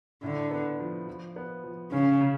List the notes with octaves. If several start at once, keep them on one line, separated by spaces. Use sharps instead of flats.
A2 D3
B3
F3
F3
B3
F3
C#3 C#4
C#3